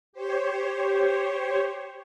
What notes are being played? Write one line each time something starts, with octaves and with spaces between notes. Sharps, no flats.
G4 C5 C#5